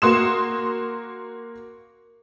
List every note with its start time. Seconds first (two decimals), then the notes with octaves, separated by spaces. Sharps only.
0.02 A#3 F#4 C6 D#6 E7